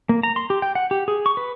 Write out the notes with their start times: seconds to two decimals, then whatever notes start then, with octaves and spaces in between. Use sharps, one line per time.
0.09 A#3
0.23 A#5
0.36 C6
0.50 G4
0.62 G5
0.75 F#5
0.91 G4
1.08 G#4
1.26 C#6
1.37 B4